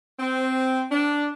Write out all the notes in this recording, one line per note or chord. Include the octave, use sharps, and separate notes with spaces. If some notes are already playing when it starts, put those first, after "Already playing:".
C4
D4